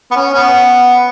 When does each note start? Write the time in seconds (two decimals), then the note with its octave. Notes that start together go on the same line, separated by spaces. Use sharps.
0.11 B3
0.16 C#4
0.33 C#4
0.37 B3